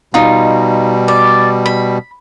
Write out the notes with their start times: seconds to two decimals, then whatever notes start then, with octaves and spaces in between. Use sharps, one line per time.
0.14 B2 G3 D#4 F4
1.08 D5
1.66 B5